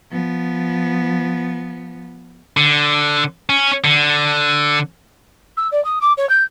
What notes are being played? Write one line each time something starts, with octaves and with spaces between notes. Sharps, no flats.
F3 B3
D3
C#4
D3
E6
D5
D#6
D6
C#5
G6